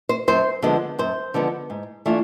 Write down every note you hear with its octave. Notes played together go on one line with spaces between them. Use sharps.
C5
F#2 C5
D3 F3 G#3 B3
F#2 C5
D3 F3 G#3 B3
G#2
E3 A3 D4 F4